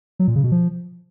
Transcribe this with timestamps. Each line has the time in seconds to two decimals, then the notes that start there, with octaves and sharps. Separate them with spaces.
0.19 F#3
0.28 A#2
0.36 C#3
0.44 B2
0.52 F3